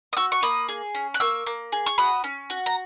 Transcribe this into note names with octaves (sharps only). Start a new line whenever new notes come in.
D#6
F#4 C#6 E6
C#6
A#3 B5 D#6
G#4
C#4
F#6
A#3 C#6 E6
A#3
G#4
C#6
F#4 B5 D#6
C#4
F#4
A#5